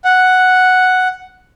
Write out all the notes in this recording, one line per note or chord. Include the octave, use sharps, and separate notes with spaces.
F#5